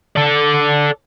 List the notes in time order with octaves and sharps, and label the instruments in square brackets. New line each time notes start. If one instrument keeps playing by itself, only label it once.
[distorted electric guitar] A4 D5